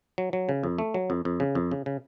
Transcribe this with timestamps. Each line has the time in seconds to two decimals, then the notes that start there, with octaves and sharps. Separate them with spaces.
0.18 F#3
0.33 F#3
0.49 C#3
0.63 F2
0.78 A3
0.94 F#3
1.10 F2
1.25 F2
1.40 C#3
1.55 F2
1.71 C#3
1.86 C#3